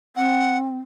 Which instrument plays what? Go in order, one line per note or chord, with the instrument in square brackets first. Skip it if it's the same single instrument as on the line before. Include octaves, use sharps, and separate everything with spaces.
[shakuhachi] C4 [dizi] F#5